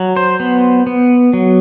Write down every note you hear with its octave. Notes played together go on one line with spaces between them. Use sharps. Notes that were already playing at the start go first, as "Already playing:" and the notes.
Already playing: F#3
C5
B3
B3
F#3